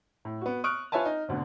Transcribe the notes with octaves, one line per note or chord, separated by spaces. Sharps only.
A2
B3 F#4
C#6 D#6 F6 F#6 D7
F4 B4 C#5 E5 G#5 A5
D#4
G#1 D2 B2 D3